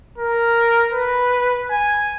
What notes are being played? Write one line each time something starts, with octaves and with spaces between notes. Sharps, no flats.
A#4
B4
G#5